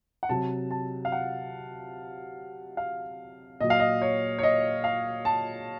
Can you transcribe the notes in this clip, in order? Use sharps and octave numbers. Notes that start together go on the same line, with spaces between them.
F#5
C3 F#3 A5
A5
F5
F#5
F5
A#2 F#3 D#5
F5
D#5
C#5
C#5
D#5
F5
A5